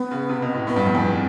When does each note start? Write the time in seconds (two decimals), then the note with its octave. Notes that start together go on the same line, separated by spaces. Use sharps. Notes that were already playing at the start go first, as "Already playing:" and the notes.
Already playing: B3
0.11 C#3
0.29 C3
0.42 B2
0.54 A2
0.67 A2 B3
0.76 G2
0.85 F2
0.95 E2
1.04 C4